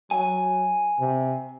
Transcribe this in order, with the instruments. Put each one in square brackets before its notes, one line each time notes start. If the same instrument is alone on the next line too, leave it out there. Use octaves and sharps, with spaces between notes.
[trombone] F#3 [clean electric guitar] G#5
[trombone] C3